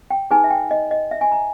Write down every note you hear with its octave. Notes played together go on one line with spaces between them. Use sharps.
G5
D#4 G#4 B4 G#5
E5
G5
D#5
D#5
E5
G#5
A#5